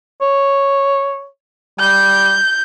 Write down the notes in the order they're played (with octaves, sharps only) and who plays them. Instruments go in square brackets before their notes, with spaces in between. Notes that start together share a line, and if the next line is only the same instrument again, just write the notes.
[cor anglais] C#5
[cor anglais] G3 [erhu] G6